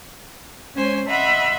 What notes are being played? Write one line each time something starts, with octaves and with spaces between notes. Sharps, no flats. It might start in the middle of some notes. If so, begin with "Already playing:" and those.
G#3 C#4 C5 C#5 G#5
D#5 E5 F#5 B5 C6